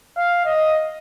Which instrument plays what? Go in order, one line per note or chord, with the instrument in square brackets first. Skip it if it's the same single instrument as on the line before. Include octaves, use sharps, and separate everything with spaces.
[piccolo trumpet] F5
D#5